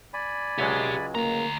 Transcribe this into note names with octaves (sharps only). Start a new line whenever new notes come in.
D5 G#5 B5
C#2 F#3 G#3 G4 E5
D2 A#3 A#5